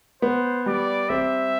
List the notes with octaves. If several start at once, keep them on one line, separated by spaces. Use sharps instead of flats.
B3 C5
G3 D5
C4 E5